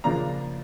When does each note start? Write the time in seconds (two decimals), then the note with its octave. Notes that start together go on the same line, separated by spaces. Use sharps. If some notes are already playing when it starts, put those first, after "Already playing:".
0.04 C#3 F3 A#3 D4 A#5